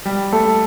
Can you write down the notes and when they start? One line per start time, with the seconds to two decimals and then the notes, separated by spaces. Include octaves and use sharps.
0.05 G3
0.32 A3 A4